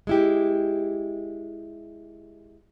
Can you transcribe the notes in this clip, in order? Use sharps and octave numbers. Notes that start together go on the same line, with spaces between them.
G#3 E4 G4